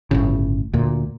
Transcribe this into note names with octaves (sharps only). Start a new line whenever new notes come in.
G1 A2 C#3
D2 A#2